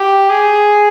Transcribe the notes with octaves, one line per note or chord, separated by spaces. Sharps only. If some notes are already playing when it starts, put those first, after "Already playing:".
Already playing: G4
G#4